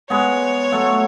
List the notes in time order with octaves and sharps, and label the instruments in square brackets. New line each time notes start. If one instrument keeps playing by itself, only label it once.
[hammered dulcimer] G#3 B3 [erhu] C#5
[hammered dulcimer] F#3 A3